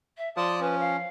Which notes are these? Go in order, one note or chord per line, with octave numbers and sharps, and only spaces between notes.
E5
F3 D5 A5 C6 D#6
C#4 B4
F5